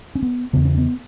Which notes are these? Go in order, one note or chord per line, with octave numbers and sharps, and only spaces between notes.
C#4
B3
E2 C#3 B3
C#4
B3